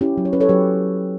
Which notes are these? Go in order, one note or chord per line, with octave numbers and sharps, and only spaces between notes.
C#4 E4 G4
F#3
C#5
C#4 B4
A4 C#5
F#3 G4 B4